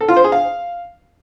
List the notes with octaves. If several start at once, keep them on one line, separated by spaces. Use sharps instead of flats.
A4
F4
C5
G#4
F5